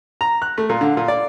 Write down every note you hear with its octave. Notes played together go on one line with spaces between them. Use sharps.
A#5
F#6
A3
A#2
D3
A#2
D5